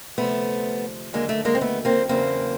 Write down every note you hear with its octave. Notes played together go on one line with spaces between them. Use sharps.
D2 C3 F3 A3 B3
D#2 D3 F#3 G#3 A#3
A3
G#3 A#3
C4
A3 B3
A#3 C4
E2 C#3 F#3 A#3 C4